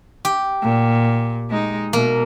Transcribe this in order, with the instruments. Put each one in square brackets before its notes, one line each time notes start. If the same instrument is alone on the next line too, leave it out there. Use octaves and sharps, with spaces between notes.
[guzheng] G4
[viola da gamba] A#2
G#3 D#4
[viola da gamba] B2 [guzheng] A#3